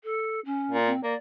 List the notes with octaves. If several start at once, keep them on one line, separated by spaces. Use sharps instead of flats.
A4
C#4
A#2
C4
A#3 D5